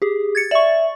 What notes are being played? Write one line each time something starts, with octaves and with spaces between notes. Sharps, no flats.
G4 G#4
G#6 A6 C#7
D5 E5 C#6